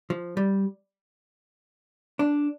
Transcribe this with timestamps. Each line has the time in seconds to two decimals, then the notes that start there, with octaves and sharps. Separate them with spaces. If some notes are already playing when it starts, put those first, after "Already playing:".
0.10 F3
0.37 G3
2.19 D4